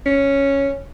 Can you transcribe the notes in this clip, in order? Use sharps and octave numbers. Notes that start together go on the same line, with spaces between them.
C#4